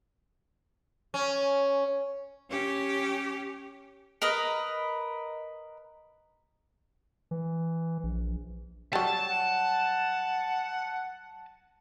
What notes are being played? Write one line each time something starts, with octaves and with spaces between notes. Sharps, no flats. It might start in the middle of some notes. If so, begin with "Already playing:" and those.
C#4
C#4 G4
A#4 B4 D#5
E3
A#1
F#3 G3 A5
F#5